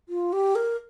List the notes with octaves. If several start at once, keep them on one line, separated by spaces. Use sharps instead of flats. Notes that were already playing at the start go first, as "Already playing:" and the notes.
F4
G4
A#4